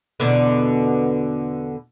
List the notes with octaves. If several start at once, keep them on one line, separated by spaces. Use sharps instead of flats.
E2 B2 D3